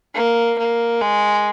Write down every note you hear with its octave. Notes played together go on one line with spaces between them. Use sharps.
A#3
A#3
G#3